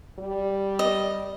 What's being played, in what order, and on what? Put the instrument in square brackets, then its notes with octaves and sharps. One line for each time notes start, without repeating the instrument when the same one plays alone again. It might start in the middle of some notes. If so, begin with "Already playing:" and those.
[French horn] G3
[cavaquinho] D#5